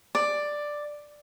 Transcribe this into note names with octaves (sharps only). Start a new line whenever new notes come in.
D5